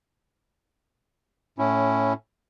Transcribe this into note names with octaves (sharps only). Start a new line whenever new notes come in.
A2 C#4 E4